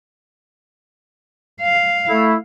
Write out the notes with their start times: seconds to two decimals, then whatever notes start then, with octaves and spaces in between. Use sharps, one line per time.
1.61 F5
2.09 A3 E4